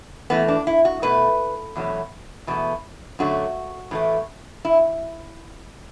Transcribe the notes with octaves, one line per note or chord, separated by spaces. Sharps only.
A2 E3 A3 B3
D4
E4
F#4
B2 A3 B4
E2 B2 F#3 A3
E2 B2 A3
F#2 D3 F#3 A3 F#4
A2 E3 A3
E4